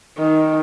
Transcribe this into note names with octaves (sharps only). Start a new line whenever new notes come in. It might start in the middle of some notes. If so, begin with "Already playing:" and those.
D#3